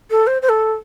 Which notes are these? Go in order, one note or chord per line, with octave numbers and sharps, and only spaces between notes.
A4
C5
C5
A4